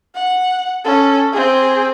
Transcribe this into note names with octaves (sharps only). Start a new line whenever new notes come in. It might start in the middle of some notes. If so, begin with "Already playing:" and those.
F#5
C#4 A4
C4 G#4